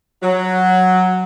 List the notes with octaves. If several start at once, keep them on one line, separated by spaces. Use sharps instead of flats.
F#3